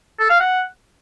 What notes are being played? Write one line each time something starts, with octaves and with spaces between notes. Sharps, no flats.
A4
F5
F#5